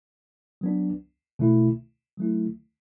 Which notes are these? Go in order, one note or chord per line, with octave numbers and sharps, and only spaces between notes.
F#3 B3 D4
B2 A3 E4
F#3 A3 E4